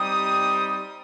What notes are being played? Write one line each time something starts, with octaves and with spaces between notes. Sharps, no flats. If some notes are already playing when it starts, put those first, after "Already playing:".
Already playing: G3 C4 D#4 G4 D#6